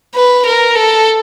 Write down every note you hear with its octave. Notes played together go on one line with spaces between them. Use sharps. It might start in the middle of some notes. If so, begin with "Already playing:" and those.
B4
A#4
A4